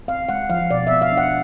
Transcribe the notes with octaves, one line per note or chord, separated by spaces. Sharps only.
C4 F5
G#3 F#5
F3 F5
B2 D5
B3 E5
F5
D4
F#5